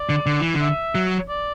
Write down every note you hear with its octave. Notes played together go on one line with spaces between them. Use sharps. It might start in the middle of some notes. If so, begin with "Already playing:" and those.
Already playing: D5
D3
D3
E3
D3
E5
F#3
D5